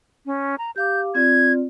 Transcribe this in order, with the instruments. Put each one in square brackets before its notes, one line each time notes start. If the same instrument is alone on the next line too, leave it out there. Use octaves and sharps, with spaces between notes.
[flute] C#4
A#5
[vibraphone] G4 F5 D6 [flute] G6
[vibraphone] C4 F4 D5 [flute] G#6